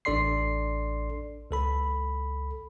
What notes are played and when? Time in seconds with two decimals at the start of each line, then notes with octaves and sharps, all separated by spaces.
0.05 A1 D4 A4 D5 C6 C7
1.51 C#2 A4 B5